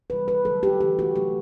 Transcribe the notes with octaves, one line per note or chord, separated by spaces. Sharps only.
C3 E3 G3 B4
B4
D3 F#3 A3 A4
G4
C3 E3 A3 G4
F#4
C3 F#3 A3 G4